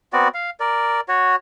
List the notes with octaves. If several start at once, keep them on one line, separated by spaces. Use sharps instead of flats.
B3 C4 F#4 D5
F5
A#4 D5
F#4 C#5